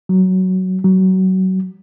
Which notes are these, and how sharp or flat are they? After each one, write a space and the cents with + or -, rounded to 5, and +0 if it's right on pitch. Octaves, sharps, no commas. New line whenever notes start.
F#3 +10
F#3 +25